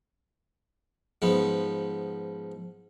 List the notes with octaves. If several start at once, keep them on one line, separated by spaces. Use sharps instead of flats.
G#2 F3 B3